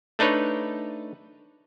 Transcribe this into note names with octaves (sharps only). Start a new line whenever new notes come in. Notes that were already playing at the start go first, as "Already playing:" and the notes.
A3 D4 D#4 B4 C#5